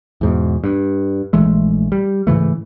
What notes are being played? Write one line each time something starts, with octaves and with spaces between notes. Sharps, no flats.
E2 G#2 B2
G2
A#1 E3 G#3 A3
G3
G#2 C#3 E3 A3